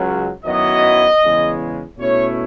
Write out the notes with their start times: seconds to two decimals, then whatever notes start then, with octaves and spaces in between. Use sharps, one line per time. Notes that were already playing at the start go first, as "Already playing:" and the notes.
Already playing: C#2 C#3 F#3
0.45 F#2 D#3 F#3 B3 E4 D#5
1.22 E2 C#3 G#3
1.98 B2 A3 C#4 E4 C#5